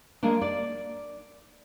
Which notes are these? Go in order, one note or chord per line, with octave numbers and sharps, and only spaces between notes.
G#3 A#3 D4
D4 D5